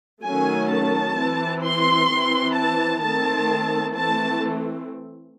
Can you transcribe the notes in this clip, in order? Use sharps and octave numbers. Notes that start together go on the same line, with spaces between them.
D#3 F#3 A3 C#4 G#5
A5
E3 C4
C6
E3 C4
A5
D#3 A3 C4 A5
E3 A3 C4 A5